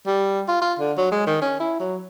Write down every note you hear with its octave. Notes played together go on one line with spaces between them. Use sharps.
G3
F4
F4
D3
F#3
G#3
D#3
C#4
E4
F#3